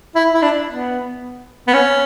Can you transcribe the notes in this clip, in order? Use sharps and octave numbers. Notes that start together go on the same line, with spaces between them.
E4
E4
D4
B3
B3
C#4